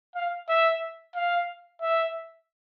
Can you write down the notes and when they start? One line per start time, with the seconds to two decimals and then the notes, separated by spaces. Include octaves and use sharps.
0.15 F5
0.49 E5
1.16 F5
1.82 E5